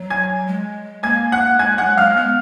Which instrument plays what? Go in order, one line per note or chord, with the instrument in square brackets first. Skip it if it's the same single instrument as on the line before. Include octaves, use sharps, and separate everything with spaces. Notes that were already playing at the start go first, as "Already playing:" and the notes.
Already playing: [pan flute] F#3
[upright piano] G#5 G#6
[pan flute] G#3
[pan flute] A#3 [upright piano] G#5 G#6
[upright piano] F#5 F#6
[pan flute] G#3 [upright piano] G#5 G#6
[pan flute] F#3 [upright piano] F#5 F#6
[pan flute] G#3 [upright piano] F5 F6
[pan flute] B3